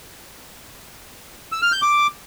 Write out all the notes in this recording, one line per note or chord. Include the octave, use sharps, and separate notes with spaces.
E6
F6
G6
D6